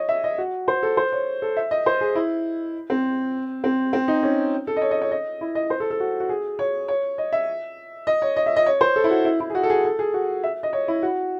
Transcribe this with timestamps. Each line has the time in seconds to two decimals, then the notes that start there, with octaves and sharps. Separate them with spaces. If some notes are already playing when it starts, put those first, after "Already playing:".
Already playing: C#5 D#5
0.09 E5
0.24 D#5
0.38 F#4
0.68 C5
0.83 A4
0.97 C5
1.12 C#5
1.42 A4
1.57 E5
1.71 D#5
1.86 C5
2.01 G#4
2.15 E4
2.90 C4
3.64 C4
3.93 C4
4.08 D#4
4.23 C#4
4.67 A4
4.76 D#5
4.82 C#5
4.91 D#5
5.01 C#5
5.11 D#5
5.41 E4
5.55 D#5
5.70 C5
5.80 A4
5.90 A4
6.00 F#4
6.20 F#4
6.29 G#4
6.59 C#5
6.88 C#5
7.18 D#5
7.32 E5
8.07 D#5
8.22 C#5
8.37 D#5
8.46 E5
8.56 D#5
8.66 C#5
8.81 C5
8.96 A4
9.04 E4
9.10 F#4
9.25 E4
9.40 E4
9.50 G#4
9.55 F#4
9.63 A4
9.70 G#4
9.85 A4
9.99 G#4
10.14 F#4
10.44 E5
10.63 D#5
10.73 C#5
10.88 E4
11.03 F#4